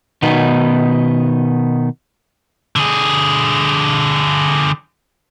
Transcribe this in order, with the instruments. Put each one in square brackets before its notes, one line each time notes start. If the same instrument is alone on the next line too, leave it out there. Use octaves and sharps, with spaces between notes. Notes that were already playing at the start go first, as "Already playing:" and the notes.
[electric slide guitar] B2 D#3 B3 D#4
[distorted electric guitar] D3 G#4